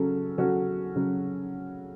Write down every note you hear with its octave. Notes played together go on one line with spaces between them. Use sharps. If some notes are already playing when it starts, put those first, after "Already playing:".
Already playing: C#3 F#3 C#4 F#4 A4
C#3 F#3 C#4 F#4 A4
C#3 F#3